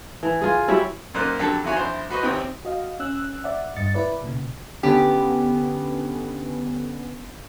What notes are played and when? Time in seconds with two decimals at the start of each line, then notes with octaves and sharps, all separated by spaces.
0.23 E3
0.41 F4 G#4
0.68 F#3 E4 G4
1.14 F#2 A#2 A#3 D#4 C5 F#6
1.39 F2 D3 F#3 G4 A4
1.64 F2 D#3 E4 F#4 C#5 G#5
1.77 A#1 E4 C5
2.10 F#4 B4 C5 D#5 C#6
2.22 G#1 D#2 C3 C4 G5 D#6
2.65 F#4 D#5 F5
3.00 C#4 E6 F#6
3.44 D5 E5 F#5
3.76 G1 G2 D#5 A6 C#7
3.94 E4 B4 D5
4.21 B1 A#2 C#3
4.83 D3 B3 C#4 G4